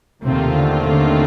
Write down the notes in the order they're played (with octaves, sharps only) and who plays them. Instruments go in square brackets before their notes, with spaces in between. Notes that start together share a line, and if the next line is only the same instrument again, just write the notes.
[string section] D#2 D#3 A3 C4 F4 [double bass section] C3
[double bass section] D3
D3